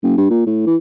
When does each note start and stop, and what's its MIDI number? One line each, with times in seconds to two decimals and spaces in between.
0.03 0.16 30
0.17 0.30 43
0.30 0.45 46
0.46 0.65 45
0.66 0.76 52